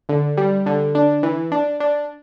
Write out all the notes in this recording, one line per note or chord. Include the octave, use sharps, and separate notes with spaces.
D3
G3
D3
D4
E3
D4
D4